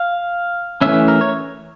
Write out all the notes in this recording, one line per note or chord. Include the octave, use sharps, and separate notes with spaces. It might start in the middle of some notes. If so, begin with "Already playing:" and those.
Already playing: F5
E3 A3 C#4 E5
A#4
C#5